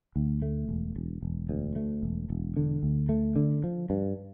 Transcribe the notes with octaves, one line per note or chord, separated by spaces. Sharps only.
D2
A3
E1
E1
E1
D2
A3
E1
E1
D3
D2
A3
D3
F3
G2